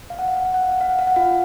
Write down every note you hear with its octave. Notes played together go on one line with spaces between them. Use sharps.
F5
F#5
F5
F#5
F5
F#5
F5
F#5
F5
F#5
F5
F#5
F4 F5